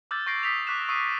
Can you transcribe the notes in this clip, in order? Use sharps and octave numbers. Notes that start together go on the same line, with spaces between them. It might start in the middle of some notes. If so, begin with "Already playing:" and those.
D6 E6 F6 G6 A6
C#6 G6 A#6 C7 D7
D#6 G6 B6 C7 F7
C#6 D6 F#6 B6 E7
C#6 D#6 E6 C7 D#7